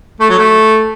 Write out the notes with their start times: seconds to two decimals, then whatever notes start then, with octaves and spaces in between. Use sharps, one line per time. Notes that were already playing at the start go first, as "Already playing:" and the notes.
0.20 A3
0.30 F#3
0.38 A3